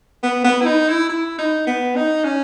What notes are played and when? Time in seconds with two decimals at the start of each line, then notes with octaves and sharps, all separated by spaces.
0.23 B3
0.44 B3
0.61 E4
0.66 D#4
0.88 E4
1.09 E4
1.38 D#4
1.67 B3
1.96 D#4
2.24 C#4